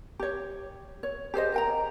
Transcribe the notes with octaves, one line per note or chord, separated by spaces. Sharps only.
G4 C#5
C#5
G4 G#4 C5 D#5
A#4 G5 A#5